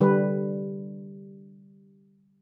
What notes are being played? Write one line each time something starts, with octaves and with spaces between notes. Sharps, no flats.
D3 G3 B4